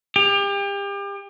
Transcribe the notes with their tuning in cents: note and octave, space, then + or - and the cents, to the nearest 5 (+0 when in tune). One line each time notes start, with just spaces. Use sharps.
G4 +35